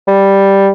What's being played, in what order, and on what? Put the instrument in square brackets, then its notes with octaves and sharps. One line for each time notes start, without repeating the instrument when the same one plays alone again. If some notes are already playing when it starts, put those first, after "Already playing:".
[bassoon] G3